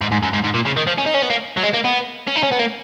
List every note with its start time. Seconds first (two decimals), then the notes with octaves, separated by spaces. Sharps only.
0.01 G#2
0.12 G#2
0.23 F#2
0.34 G#2
0.44 G#2
0.55 A#2
0.66 C#3
0.77 D#3
0.87 F3
0.98 C#4
1.06 D#4
1.14 C#4
1.22 B3
1.30 A#3
1.57 F#3
1.63 G#3
1.73 A#3
1.84 B3
2.27 C#4
2.36 D#4
2.43 C#4
2.52 B3
2.60 A#3